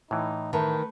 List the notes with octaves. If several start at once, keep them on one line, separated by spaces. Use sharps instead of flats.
A2 E3 D#4
D#3 A3 B4